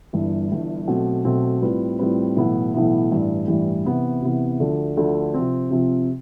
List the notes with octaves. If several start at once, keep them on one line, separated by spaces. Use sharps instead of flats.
G1 G2 E3
G1 G2 E3
B1 B2 A3 C4
B1 B2 A3 C4
A2 G3 C4 F4 B4
A2 G3 C4 F4 B4
B1 A2 E3 B3 E4
B1 A2 E3 B3 E4
A1 G2 E3 G3
A1 G2 E3 G3
C3 E3 B3
C3 E3 B3
D2 D3 F3 A3
D2 D3 F3 A3
C3 F3 C4
C3 F3 C4